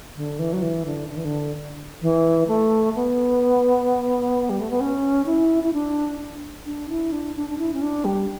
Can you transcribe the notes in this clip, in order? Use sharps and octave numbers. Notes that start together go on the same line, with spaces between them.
D3
E3
F#3
E3
D3
D3
E3
D3
E3
A3
B3
G3
A3
B3
C#4
E4
E4
D4
D4
E4
D4
D4
D4
E4
C#4
D4
G3